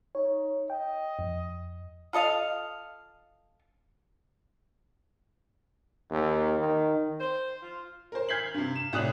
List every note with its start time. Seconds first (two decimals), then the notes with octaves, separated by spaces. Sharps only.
0.15 D#4 C#5
0.70 D#5 G5
1.19 F2
2.13 F4 A4 D#5 F5
6.10 D#2
6.59 D#3
7.20 C5
7.62 F4
8.12 A#4 C5
8.29 F6 G6 G#6 B6 C7 F#7
8.54 G2 C3
8.76 E7
8.93 C2 A2 D5 D#6 F#6 F7